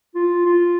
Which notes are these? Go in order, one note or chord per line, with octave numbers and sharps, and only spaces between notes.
F4
F4